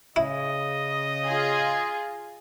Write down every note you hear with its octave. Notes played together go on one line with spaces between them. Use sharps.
C#3 E4 D#5
F4 G#4